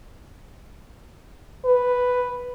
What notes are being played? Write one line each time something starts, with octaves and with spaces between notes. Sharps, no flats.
B4